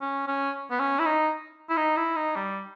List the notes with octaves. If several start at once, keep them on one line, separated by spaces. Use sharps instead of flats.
C#4
C#4
B3
C#4
E4
D#4
E4
D#4
E4
D#4
G3